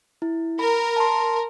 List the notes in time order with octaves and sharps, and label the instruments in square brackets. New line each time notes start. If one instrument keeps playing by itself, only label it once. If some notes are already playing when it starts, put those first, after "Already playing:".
[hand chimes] E4
[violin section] A#4 [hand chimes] B5
[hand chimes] A5 C6